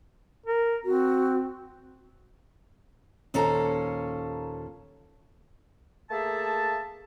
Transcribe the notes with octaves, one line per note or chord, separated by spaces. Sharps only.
A#4
C4 F#4
D#2 A#2 C#4 A4 C5 A#5
A3 A#3 G#4 E5 A5